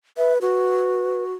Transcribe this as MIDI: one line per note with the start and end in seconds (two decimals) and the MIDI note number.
0.17 0.38 71
0.17 0.33 76
0.41 1.34 66
0.41 1.24 71